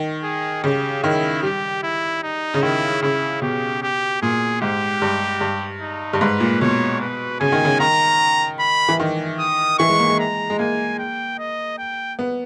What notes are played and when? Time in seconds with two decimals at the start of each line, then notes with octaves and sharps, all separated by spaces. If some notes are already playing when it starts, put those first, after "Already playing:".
Already playing: D#3
0.23 G#4
0.63 C#3 G4
1.03 D#3 E4
1.43 G3 G4
1.83 E4
2.23 D#4
2.54 C#3
2.62 D#3 E4
3.02 C#3 E4
3.42 B2 G4
3.82 G4
4.22 A#2 G#4
4.62 G#2 G4
5.02 G2
5.41 G2
5.81 D#4
6.13 G2
6.21 G#2 B4
6.40 A#2
6.61 B2 C#5
7.01 B4
7.40 C#3 G#5
7.52 D#3
7.65 C#3
7.80 D#3 A#5
8.60 B5
8.88 E3
9.00 D#3
9.39 D#6
9.79 E3 C#6
9.89 G#3
10.00 A#3
10.09 G#3
10.19 A#5
10.50 G#3
10.59 A#3 G#5
10.99 G5
11.38 D#5
11.78 G5
12.19 B3